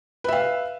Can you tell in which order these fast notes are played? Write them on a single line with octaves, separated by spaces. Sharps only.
B4 E5 F5